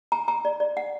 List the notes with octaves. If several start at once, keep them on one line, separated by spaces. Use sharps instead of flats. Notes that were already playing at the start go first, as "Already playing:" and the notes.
A#5
A#5
D5
D5
F#5